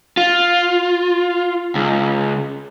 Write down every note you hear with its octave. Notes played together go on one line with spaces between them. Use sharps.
F4
C#2